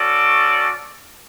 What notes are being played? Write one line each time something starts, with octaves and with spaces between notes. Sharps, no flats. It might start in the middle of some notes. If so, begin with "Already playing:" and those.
Already playing: C#4 F#4 A4 D5